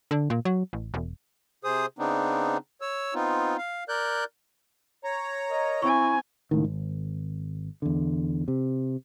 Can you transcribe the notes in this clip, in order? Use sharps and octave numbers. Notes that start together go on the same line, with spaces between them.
D3
A#2
F#3
A1
E1
C3 G#4 C5 D#6
C#3 B3 C4 D4 D#4
C#5 E6
B3 C4 D#4 F4
F5
A#4 D5 F#6 G6
C#5 A#5
A#4 D#5
C4 E4 G#5 C#6
C#2 A2 D#3
G#1
E2 D3
C3